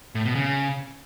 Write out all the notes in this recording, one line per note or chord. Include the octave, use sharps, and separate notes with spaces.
A2
B2
C#3